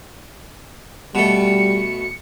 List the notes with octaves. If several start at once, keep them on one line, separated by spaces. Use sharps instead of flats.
B2 G3 A3 C#7